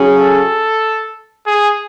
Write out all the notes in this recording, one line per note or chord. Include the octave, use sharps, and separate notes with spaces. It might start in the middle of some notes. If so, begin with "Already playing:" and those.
Already playing: C#3 F#3 C#4 G#4
A4
G#4